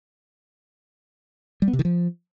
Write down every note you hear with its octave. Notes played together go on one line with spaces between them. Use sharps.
G3
B3
C3
D#3
F3